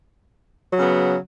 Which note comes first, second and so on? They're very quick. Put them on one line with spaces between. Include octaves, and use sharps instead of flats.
F#3 C#3 B3